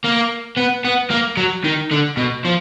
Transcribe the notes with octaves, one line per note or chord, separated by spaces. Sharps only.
A#3
B3
B3
A#3
F#3
D#3
D3
B2
F3